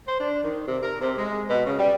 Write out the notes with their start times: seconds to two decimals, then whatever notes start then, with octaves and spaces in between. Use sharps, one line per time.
0.07 C5
0.20 D4
0.43 D#3
0.68 C3
0.83 A#4
1.00 C3
1.17 G#3
1.50 B2
1.65 C#3
1.79 G3